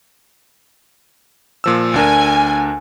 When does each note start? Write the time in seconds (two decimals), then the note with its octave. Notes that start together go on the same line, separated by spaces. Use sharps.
1.64 A#2 F3 E6
1.94 D2 D4 A#4 G#5